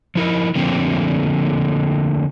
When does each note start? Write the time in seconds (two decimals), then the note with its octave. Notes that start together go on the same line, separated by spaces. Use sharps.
0.15 F3 E4 A#4
0.55 D3 F3 A3 A#3 C4